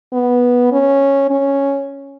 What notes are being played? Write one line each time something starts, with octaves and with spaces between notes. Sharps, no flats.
B3
C#4
C#4